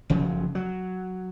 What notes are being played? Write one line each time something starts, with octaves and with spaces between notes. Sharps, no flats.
F#1 C#3 F3 F#3
F#3